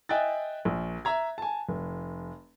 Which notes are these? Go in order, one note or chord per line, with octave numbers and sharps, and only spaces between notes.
D#5 E5 G5 G#5 F#6 A6
A#1
E5 A#5 G#6
G#5 A5
F1